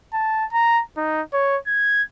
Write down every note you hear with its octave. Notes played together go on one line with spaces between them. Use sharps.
A5
A#5
D#4
C#5
G#6